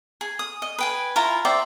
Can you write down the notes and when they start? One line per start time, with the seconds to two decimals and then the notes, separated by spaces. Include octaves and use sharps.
0.21 G#4
0.39 D#6
0.62 D#5
0.78 B4 G5 G#5
1.16 E4 F4 A#5
1.45 C5 D5 E5 G5